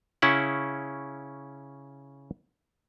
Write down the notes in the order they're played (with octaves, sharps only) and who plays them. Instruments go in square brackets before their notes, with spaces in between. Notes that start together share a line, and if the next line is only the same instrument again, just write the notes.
[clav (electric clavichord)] C#3 C#4 E4 F#5